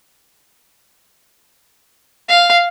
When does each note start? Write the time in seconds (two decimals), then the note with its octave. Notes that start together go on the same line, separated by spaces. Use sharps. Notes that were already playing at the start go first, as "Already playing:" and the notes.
2.29 F5